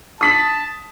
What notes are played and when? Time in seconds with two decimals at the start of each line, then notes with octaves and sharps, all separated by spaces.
0.21 A5 D#6 B6 F#7